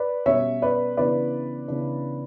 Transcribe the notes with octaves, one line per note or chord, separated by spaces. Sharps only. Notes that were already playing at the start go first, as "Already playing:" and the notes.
Already playing: B4 D5
B2 G3 C#4 C#5 E5
B4 D5
C#3 E3 B3 D4 B4 D5
C#3 E3 B3 D4